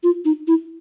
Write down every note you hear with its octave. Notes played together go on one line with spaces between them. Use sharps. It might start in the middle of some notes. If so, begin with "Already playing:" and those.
F4
D#4
E4